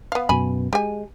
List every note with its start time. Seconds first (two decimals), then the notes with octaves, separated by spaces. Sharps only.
0.12 B3 F5
0.29 F#2 B2 B3 G#5 B5
0.73 G#3 G4 G#5